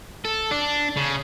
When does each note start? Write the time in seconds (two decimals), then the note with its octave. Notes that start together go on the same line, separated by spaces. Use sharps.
0.25 A4
0.51 D4
0.97 C#3